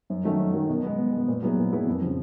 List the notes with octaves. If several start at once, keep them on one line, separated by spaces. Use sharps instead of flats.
F#2
D#3 F#3 A3 C#4
F#2
D#3 F#3 A3 C#4
B2
G#3 B3
B2
G#3 B3
A#2
F#3 B3 E4 G#4
A#2
F#3 B3 E4 G#4
F2
C#3 F3